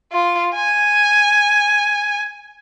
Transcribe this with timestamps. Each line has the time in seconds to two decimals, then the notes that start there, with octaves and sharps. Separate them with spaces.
0.12 F4
0.55 G#5